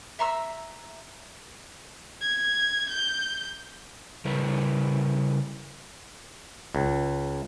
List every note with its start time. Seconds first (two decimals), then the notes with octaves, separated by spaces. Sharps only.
0.19 E5 A#5 C6 E6
2.21 G#6
2.90 G6
4.25 C#3 G3 E4 A#4 B4
6.75 C#2